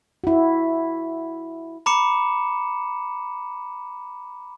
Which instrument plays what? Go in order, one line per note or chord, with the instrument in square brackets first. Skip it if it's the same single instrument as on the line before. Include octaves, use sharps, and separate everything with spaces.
[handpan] E4 F#4
[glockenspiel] A#5 B5 D6 C#7 E7